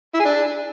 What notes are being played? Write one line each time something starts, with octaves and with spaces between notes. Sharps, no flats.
E4
G#4
D4